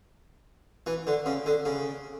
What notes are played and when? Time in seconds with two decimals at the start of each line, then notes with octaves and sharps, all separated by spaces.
0.86 E3
1.07 D3
1.26 C#3
1.46 D3
1.66 C#3